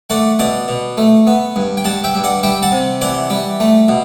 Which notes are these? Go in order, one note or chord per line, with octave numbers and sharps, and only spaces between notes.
A3 D5 F#5
B2 D5 F#5
B2
A3
B3
G2
G5
G2 F#5 A5
E5 G5
G2
D5 F#5
G3 E5 G5
F#5 A5
C3
E3 D5 F#5
G3
A3
B2